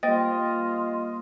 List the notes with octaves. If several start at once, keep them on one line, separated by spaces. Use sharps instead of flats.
G3 A#3 F4 C5 D#5 G5 A6